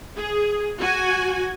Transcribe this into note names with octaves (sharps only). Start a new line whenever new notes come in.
G#4
F#4 G#5